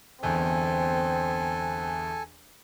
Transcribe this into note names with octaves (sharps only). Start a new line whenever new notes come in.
G1 E2 C4 A4 G#5